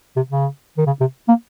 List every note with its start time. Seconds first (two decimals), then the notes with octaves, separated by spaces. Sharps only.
0.16 C3
0.30 C#3
0.77 D#3
0.86 C#3
1.00 C3
1.28 A#3